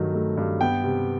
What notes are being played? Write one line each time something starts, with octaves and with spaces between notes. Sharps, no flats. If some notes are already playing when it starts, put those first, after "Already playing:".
Already playing: G2 D#3 F#3 A3
A3
G2
B3 G5
C3